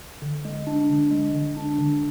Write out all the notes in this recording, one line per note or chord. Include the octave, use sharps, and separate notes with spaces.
D3
G#3
D4
D3
G#3
D3
D4
D3